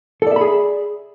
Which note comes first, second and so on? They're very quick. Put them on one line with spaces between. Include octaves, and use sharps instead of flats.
A4 D5 E5 B5 G#4